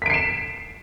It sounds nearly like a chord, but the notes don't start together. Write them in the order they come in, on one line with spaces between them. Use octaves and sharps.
B6 D7 C7 E7